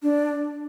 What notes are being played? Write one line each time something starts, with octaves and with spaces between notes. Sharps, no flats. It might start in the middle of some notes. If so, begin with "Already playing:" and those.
D4